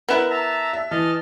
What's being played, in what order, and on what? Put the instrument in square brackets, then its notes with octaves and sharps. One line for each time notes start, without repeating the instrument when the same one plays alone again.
[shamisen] B3 E4 [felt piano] A#4 F#6 E7
[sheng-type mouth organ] E5 A5 A#5
[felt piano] E5
[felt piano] E3 [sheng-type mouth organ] D#5 A5 F6